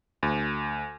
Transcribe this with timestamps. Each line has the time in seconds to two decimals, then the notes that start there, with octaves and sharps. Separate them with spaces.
0.23 D2